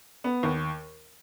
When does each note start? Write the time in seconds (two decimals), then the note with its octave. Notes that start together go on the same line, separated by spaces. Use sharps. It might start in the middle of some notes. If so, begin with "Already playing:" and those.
0.24 B3
0.43 D#2